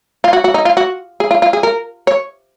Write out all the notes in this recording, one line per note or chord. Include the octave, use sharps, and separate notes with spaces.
F4
F#4
F#4
D#4
F4
F#4
G#4
F4
F4
G#4
A#4
C#5